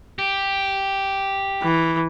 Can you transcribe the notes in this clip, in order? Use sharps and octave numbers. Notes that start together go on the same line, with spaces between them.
G4
E3